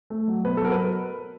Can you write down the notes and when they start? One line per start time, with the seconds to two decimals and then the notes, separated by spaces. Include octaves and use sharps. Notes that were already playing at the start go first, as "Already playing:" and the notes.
0.10 A3
0.28 F#3
0.45 B2 B4
0.57 A4
0.62 F#3 A#4
0.72 B4